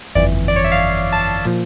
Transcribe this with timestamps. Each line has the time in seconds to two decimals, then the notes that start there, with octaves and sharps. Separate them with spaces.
0.15 G1 F2 E3 D5
0.48 D5
0.56 C#5
0.64 E5
0.72 F5
1.13 A5
1.45 A#2 F3